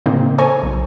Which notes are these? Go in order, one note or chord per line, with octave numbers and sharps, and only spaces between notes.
A2 C#3 A#3 C4 D#4
A4 C5 G#5 A#5 C#6
B1